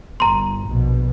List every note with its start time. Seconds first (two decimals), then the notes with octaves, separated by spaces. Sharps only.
0.20 G1 A#5 C6
0.68 A#1 B2